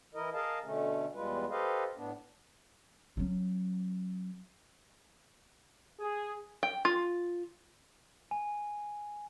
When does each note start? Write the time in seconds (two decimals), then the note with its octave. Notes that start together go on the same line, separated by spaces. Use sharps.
0.14 E3 E4 A#4 D#5
0.34 G#4 A#4 D#5 F5 A5
0.64 B2 D3 A3 C#4
1.14 E2 G3 G#3 F4 B4
1.50 G4 A4 B4 C5 D#5 F5
1.96 A2 B3 D4
3.17 F#3 C#4
6.00 G#4
6.63 G5
6.85 F4
8.31 G#5